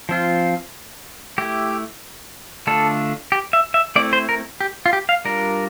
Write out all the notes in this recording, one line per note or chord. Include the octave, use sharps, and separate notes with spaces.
F3 C4 F4
A3 E4 G4
D3 A3 D4 F4 A4
G4
E5
E5
A3 C4 E4 D5
C5
A#4
G4
F4
G4
F5
G3 D4 F4 A#4